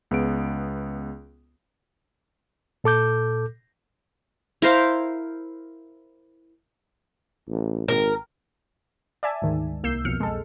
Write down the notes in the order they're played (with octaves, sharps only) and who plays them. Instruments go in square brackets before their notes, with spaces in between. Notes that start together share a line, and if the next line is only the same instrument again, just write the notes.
[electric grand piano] C#2 B3 G#4 D7
[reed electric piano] A#2 A4 D6 G6
[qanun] E4 A#4 C5 F5
[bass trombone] A1
[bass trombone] G#1 [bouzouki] A#4
[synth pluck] D5 E5 G#5 A5
D2 G#2 D#3
C2 A#3 E6 G6 C7
B1 F2 F6 C#7
G#3 A4